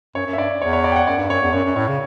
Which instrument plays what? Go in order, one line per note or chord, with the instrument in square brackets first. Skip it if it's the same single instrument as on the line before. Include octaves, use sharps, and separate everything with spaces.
[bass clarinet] F#2 [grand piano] C#5
[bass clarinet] F#2
[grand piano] E5
[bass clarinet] G2 [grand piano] D5
[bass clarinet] E2 [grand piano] C#5
[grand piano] C#5
D5
G5
F#5
[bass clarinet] F#2 [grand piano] D5
[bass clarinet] G2
[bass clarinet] F#2 [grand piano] C#5
[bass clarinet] E2
[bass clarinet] F#2 [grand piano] C#5
[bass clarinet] F#2
[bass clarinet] A2 [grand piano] C#5
[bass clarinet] C#3